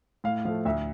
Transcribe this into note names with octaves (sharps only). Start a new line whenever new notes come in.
A2 F5
F3 A3 F5
D2 E5